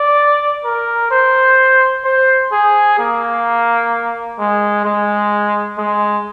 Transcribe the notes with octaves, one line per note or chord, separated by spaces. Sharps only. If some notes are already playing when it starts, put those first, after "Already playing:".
Already playing: D5
A#4
C5
C5
G#4
A#3
G#3
G#3
G#3